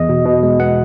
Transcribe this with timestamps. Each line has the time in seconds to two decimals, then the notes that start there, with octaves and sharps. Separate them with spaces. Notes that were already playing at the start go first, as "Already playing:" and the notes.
Already playing: E2 D#5
0.09 B2
0.25 B2
0.43 G#3
0.60 B3 F#5